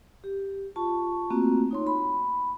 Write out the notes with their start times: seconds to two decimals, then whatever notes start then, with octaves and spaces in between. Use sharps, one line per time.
0.24 G4
0.76 F4 A5 C#6
1.30 A3 A#3 C4 F4 F#4
1.71 D#4 C#5 C6
1.87 B5